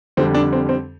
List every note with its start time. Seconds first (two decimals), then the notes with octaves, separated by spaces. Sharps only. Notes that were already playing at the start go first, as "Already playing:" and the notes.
0.17 F2 D3 G3 C4
0.35 D4
0.53 C4
0.69 C4